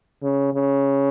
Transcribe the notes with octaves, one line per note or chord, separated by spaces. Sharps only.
C#3
C#3